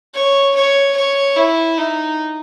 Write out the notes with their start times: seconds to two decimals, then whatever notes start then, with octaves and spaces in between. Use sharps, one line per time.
0.14 C#5
0.56 C#5
0.97 C#5
1.36 E4
1.78 D#4